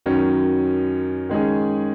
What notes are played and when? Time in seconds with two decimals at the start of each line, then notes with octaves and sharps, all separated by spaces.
0.06 F#2 D#3 F#3 C#4
1.29 D#3 G#3 C#4 G#4